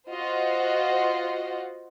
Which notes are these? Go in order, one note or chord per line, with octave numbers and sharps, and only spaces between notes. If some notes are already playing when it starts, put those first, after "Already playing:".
F4 F#4 C5 D#5 F#5